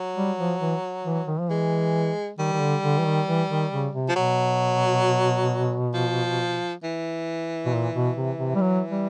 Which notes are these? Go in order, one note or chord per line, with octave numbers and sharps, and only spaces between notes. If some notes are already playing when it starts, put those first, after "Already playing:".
Already playing: F#3
G3
F3
E3
E3
D#3
F3
E3 G#3
D#3 G3
D#3
D3
D3
E3
D#3
E3
D#3
C#3
C3
F3
B2 F#3
F3
E3
B2
A#2
B2
C3
C3
G3
F#3
G3